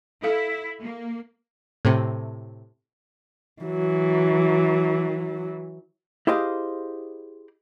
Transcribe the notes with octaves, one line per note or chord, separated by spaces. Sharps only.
E4 A4 F5
A#3
A2 C3
E3 F#3
E4 G4 G#4 C5 D#5 F5